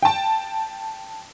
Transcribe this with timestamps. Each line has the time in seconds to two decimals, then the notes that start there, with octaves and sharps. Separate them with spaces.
0.02 G5 A5